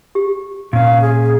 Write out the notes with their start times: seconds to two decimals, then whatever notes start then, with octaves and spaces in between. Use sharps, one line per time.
0.15 G4
0.73 A#2 C#4 F5
1.02 G#4